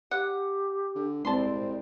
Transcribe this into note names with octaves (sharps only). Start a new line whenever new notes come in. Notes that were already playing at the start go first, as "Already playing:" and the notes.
G4 F#5
D3
C2 G#3 C4 D5 A5 C6